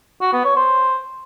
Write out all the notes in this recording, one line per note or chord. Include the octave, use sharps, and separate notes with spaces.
F#4
B3
C#5
C5